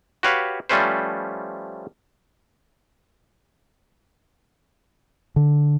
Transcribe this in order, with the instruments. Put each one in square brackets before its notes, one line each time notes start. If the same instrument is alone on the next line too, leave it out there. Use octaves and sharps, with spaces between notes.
[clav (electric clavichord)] F#4 G4 B4 C#5 F5
F3 G3 A3 C#4 B4 C5
[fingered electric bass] D3